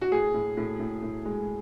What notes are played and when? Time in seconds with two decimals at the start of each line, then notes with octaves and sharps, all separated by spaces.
0.01 F#4
0.11 A2 G#4
0.34 A2
0.57 A2
0.80 A2
1.03 A2
1.25 G#3